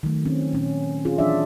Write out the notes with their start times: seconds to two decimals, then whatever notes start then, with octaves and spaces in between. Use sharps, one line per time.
0.03 D#3 F#3 A3
0.26 C4 C#4
0.53 A#2 C#4
1.05 C#4 F4 G#4
1.18 E3 F#3 D4 D5 E5